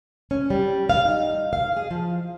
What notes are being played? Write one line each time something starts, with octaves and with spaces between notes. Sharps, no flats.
C#4
G3
F5
D#4
F5
G#4
F3